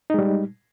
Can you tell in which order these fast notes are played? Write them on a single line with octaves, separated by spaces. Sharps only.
D#4 G#3 G3